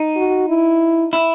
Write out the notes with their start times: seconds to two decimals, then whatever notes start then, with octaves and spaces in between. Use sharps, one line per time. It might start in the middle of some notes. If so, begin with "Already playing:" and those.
Already playing: D#4
0.16 F#4
0.48 E4
1.13 E4